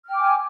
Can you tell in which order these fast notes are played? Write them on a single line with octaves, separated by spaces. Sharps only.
F6 G5 D6 G#5